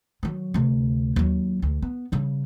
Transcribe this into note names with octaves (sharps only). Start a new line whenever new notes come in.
D#3 F#3
D2 C3
D#2 F#3
D2
B3
C#3 G3